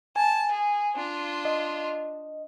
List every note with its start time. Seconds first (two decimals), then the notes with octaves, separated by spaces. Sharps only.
0.16 G#5 A5
0.52 G#4
0.96 D4 F4
1.45 D#5